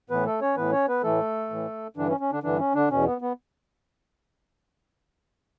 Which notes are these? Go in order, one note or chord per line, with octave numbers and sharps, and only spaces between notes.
A2 E3 B3 B4
A3 A4
C#4 C#5
A2 E3 B3 B4
C#4 C#5
B3 B4
A2 E3 A3 A4
A2 E3
G2 D3 E3 D4
C#4
C#4
D3 D4
G2 D3 E3 D4
C#4
D3 D4
E2 B2 C#4
B3
B3